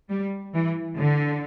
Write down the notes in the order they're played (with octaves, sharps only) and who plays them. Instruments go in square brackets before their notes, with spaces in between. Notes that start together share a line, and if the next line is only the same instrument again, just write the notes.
[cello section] G3
E3
D3